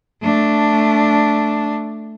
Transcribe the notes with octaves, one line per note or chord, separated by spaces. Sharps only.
A3 D4